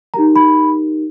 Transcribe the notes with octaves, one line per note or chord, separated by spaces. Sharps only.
D#4 G4 A#4 A#5
B5